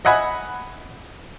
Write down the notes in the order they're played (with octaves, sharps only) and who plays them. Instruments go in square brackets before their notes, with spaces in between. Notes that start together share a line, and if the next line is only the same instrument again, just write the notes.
[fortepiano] D#5 E5 F#5 G#5 B5